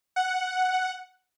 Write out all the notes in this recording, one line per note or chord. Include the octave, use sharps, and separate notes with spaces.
F#5